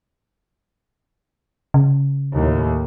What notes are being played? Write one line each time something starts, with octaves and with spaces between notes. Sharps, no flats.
C#3
D#2 A2